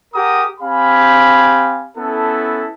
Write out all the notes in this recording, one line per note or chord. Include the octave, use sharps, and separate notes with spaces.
G4 G#4 A#4 F#5 A#5 D#6
C4 G4 F5 G#5 B5
B3 C#4 E4 A4